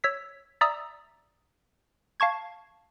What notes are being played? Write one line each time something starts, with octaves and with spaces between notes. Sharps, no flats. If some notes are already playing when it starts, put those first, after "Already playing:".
C#5 E6 B6
D5 E5 A#5 D#6 E6
F5 A5 C#6 G#6